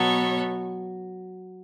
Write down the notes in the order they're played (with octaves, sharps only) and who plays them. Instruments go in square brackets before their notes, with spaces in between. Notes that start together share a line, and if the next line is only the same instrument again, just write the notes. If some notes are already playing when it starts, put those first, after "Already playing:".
Already playing: [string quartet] B2 B3 A4 C#5 [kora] F#3